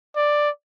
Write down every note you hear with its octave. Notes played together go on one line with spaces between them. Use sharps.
D5